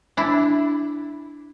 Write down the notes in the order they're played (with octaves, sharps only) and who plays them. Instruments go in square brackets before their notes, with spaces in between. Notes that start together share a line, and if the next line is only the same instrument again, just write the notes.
[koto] D4 E4